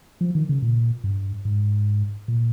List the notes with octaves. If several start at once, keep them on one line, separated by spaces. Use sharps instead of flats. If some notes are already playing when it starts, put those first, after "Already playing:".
F3
D#3
C#3
A#2
G2
G#2
A#2